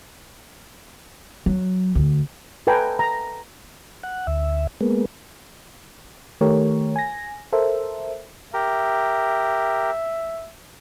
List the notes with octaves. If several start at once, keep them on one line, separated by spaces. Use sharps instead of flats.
F#3
D2
A4 B4 G5 G#5 A#5
A#5
F#5
D2 E5
G#3 A#3 B3
D#3 A3 G4 A#4 C#5
G#5 A#6
A4 A#4 C5 E5
G4 A#4 E5